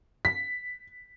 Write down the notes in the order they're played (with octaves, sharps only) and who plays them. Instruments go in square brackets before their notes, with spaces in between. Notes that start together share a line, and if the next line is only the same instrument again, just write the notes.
[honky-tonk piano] B6